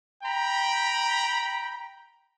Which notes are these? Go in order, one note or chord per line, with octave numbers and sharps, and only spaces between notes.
G5 A#5 B5